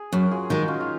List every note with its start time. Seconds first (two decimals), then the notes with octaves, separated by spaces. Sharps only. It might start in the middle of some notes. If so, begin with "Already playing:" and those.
Already playing: G#4
0.13 F#2 F#4 A#4
0.31 F4 G#4
0.50 D#3 G#3 D#4 F#4
0.68 C#4 F4
0.80 F4